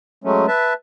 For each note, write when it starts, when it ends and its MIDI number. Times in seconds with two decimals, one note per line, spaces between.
0.24 0.46 54
0.24 0.46 56
0.24 0.46 57
0.24 0.46 61
0.48 0.73 71
0.48 0.73 76
0.48 0.73 81